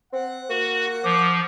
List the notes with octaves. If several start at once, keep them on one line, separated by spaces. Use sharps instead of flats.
C4 F#5
A#3 F#4
F3 D6